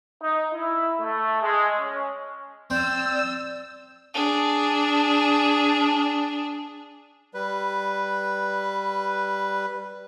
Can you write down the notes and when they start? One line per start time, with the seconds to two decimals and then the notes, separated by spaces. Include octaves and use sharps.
0.22 D#4
0.53 E4
1.01 A3
1.42 G#3
1.79 C#4
2.70 C4 D5 E6 G6
4.14 D4 G#4
7.34 G3 B4